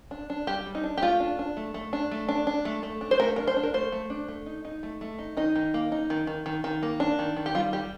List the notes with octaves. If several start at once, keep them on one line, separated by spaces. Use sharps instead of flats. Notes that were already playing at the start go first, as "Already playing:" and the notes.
D4
D4
G3 G4
G3
D#4
D4
G4
A3 F4
D4
D4
A3
A3
D4
A3
D4
D4
A3
A3
D4
C5
A3 A#4
D4 A#4
C5
D4
A#4
A3 C5
A3
D4
A3
D#4
D#4
A3
A3
D#4
D#3 D#4
D#3
A#3
D#4
D#3
D#3
D#3
D#3
A#3
D4
D#3
D#3
G4
G3 F4
G3 G4